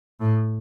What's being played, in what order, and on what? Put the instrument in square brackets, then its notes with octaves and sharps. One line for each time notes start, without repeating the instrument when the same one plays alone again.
[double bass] A2